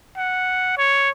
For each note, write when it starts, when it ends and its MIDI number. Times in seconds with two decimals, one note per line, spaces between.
0.17 0.76 78
0.77 1.10 73